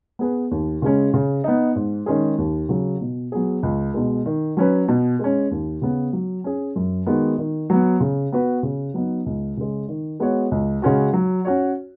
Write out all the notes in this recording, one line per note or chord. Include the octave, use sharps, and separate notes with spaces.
B3 G#4 B4
D#2
C#3 G#3 C#4
C#3
B3 D#4
G#2
D#3 G#3 C#4 G#4
D#2
C#3 F#3
B2
F#3 B3 G#4
C#2
B2 G#3
D#3
F#3 C#4 B4
B2
G#3 C#4
D#2
C#3 B3
F#3
C#4 G#4
F#2
D#3 G#3 B3 F#4
D#3
F#3 B3
C#3
B3 F#4 B4
C#3
F#3 B3 D#4
C#2
C#3 G#3
D#3
G#3 B3 F#4 C#5
C#2
C#3 G#3 C#4 F#4
F#3
C#4 F#4 C#5